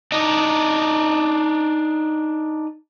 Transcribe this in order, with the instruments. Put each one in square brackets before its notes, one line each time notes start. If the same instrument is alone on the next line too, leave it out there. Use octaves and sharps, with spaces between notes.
[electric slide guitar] D4 D#4 D#5